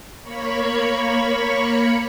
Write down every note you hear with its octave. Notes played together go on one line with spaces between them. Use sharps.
A#3 C#5 B5 C#6